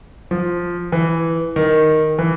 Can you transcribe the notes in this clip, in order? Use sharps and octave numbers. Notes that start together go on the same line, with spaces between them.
F3
E3
D#3
E3